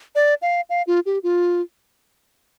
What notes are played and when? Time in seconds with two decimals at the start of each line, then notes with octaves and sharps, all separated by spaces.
0.15 D5
0.42 F5
0.70 F5
0.87 F4
1.06 G4
1.23 F4